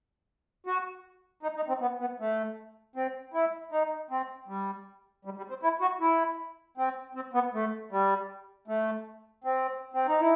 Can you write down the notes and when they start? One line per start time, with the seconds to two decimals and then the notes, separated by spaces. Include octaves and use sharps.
0.66 F#4
1.43 D#4
1.56 D#4
1.68 C4
1.81 B3
2.00 B3
2.20 A3
2.96 C4
3.34 E4
3.72 D#4
4.10 C4
4.48 G3
5.25 G3
5.37 G3
5.49 C4
5.63 E4
5.81 F#4
6.00 E4
6.78 C4
7.15 C4
7.34 B3
7.54 A3
7.91 G3
8.68 A3
9.44 C4
9.94 C4
10.08 D#4
10.21 E4